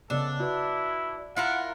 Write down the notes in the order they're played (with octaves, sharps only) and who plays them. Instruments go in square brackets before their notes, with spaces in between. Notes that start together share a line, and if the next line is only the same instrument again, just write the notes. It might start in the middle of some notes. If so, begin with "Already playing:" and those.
[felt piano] C#3 B3 D#5 [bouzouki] D4 [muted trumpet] A4
[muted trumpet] E4 [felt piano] F#4 B4
[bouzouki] E4 F4 A#4 [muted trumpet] F#5